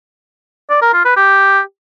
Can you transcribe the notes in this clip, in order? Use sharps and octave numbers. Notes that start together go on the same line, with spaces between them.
D5
A#4
F4
B4
G4